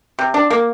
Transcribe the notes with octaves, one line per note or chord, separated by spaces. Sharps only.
C3
D4
A#3